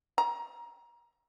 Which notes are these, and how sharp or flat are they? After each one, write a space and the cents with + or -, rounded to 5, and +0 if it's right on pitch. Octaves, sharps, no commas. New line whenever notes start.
A#5 +25